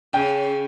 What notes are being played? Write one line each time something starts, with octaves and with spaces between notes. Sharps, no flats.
C#3 C#4 G5